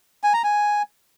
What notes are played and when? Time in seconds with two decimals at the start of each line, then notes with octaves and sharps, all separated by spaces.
0.23 G#5
0.34 A#5
0.44 G#5